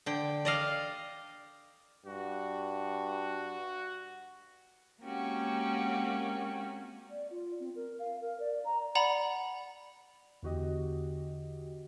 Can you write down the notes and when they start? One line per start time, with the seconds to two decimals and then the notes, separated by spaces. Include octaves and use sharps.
0.06 D3 G5
0.45 D5 D#5 F5
2.06 G2 F#4
5.02 G#3 A#3 C4 C#4 F#4 G4
7.10 D5
7.31 F4
7.60 C4
7.75 A#4
7.99 F5
8.21 A#4
8.40 D5
8.65 A#5
8.95 D5 F#5 A#5 B5
10.43 E2 D3 F#4 G4 D#5